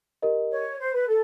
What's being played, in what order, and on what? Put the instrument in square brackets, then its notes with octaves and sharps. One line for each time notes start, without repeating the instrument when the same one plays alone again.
[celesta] G4 A#4 D#5
[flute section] C#5
C5
B4
A4